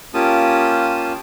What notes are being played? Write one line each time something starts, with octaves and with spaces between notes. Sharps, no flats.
A#3 C#4 F4 G4 A5 D#6